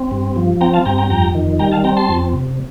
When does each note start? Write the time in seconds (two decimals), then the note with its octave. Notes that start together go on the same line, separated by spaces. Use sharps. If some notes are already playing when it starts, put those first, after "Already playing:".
Already playing: C4
0.11 G2
0.36 F3
0.61 C4 G5 A#5
0.74 F5 A5
0.85 G2 G5 A#5
0.98 G5 A#5
1.10 F2 G5 A#5
1.35 D#3
1.59 G3 G5 A#5
1.72 F5 A5
1.84 C4 G5 A#5
1.97 A5 C6
2.09 F2
2.33 C3